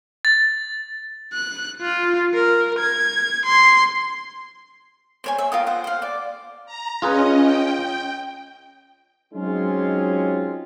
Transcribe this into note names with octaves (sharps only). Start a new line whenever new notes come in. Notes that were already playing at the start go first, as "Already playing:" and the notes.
A6
F#6
F4
A#4
G#6
C6
C5 C#5 G#5
E5
F4 A#4 G5 D#6
C5 F#5
C5 F5
D5
A#5
C#4 F4 G#4 B4 D#5
G5
F#3 G#3 C4 C#4 D#4 F4